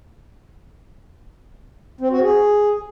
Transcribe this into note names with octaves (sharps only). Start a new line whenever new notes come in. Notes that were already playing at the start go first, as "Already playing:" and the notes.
C4
F#4
G#4